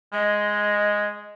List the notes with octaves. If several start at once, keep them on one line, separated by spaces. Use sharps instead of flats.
G#3 D#5